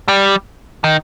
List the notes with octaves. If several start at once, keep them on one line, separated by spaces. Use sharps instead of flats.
G3
D#3